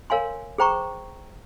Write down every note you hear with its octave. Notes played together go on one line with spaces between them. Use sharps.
A#4 C#5 F5 G#5 C6
G#4 C5 G5 A#5 C#6